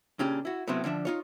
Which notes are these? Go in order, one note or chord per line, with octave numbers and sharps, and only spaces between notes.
A#2 C#3 C#4 D4 G4
E4 F#4
A2 C3 F#3 B3 C4 E5
D3 F3 D4 E5
D#4 F4 C#5